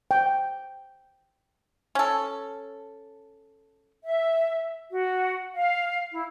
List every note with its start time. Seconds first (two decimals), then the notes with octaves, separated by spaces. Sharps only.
0.11 G5
1.95 C#4 A4
4.05 E5
4.92 F#4
5.55 F5
6.12 E4